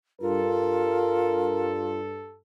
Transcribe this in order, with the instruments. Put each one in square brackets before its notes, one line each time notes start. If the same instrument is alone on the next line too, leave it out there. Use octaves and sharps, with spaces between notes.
[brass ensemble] G2 A4 [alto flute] F4 [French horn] A#4